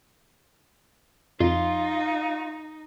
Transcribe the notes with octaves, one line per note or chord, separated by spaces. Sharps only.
F2 D#4 F4